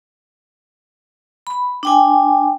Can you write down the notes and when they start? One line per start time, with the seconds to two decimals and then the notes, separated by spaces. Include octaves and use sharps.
1.47 B5
1.83 D4 G5 G#5